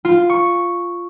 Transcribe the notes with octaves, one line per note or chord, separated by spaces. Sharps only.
F4
C#6